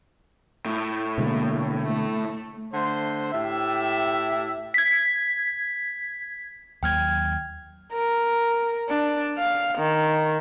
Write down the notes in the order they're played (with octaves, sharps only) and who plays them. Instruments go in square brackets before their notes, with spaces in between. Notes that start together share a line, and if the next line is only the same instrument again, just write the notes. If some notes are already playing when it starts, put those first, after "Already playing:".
[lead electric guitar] A2
[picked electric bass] B2 D3 G#3 [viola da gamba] A#3
[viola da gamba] A3
[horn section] D3 A3 C5
A2 G4 E5
[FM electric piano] G#6 B6
[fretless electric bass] D#2 F#3 A#3 [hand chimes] G5 F6 G#6
[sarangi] A#4
D4
F5
D#3